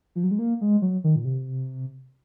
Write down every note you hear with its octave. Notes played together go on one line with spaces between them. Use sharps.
F3
F#3
G#3
A#3
G#3
F#3
D#3
A#2
C3